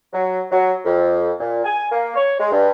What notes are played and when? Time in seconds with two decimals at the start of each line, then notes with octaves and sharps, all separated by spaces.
0.13 F#3
0.51 F#3
0.85 F2
1.40 A#2
1.64 G#5
1.91 A#3
2.15 C#5
2.39 G#3
2.51 G2